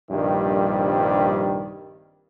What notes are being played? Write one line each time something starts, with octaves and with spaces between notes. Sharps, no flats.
A#1 G2 C3 D#3 G3